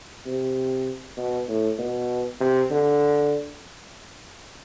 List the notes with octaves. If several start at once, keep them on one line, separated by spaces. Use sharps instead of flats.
C3
B2
A2
B2
C3
D3